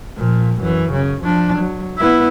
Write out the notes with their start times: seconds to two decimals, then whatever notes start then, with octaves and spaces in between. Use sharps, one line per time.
0.17 A#2 F3
0.62 F#2 E3
0.92 C#3
1.24 F3 D4
1.59 F#3
1.98 B3 E4